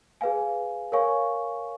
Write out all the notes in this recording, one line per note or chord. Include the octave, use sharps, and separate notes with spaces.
G#4 B4 F5 G#5
A#4 C#5 F5 G#5 C#6